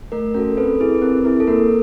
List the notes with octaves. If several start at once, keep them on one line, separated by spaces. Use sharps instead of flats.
A3 A#4
C#4 F#4 A4 A#4
C4 A4 B4
E4 G#4
B4
C4 A#4
E4 G#4 A#4
A4
A#3 A#4